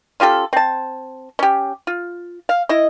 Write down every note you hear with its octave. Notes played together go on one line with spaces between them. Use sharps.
C#4 F4 G4 A4
C4 A5
C#4 G4
F4
F5
E4 D#5